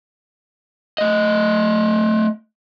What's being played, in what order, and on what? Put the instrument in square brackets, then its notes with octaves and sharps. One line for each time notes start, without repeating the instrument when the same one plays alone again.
[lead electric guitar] A3 D#5